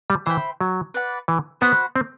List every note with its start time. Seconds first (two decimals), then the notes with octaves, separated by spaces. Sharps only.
0.10 G3
0.26 E3 C5 E5 G5 B5
0.61 F#3
0.94 B4 D5 F#5
1.28 E3
1.61 B3 F#4 C5 F#5 B5
1.96 C4